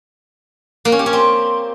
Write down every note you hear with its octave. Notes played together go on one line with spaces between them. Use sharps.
A#3
C#4
G4
C#4
C4